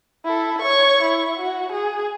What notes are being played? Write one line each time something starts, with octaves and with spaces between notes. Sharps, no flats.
E4 A4
C#5 C#6
E4
F#4
G#4